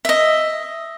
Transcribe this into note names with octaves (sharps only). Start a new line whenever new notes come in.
D#5 E5